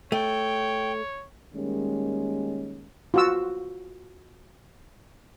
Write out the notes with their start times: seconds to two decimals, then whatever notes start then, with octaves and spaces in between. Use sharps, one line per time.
0.12 A3 C#5 G5
1.55 D#3 G3 G#3 A#3 C#4
3.14 F4 F#4 E6